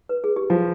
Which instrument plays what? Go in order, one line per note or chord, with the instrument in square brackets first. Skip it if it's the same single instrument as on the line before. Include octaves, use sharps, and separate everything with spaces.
[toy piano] B4
G#4
G4
[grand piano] F3 [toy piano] F4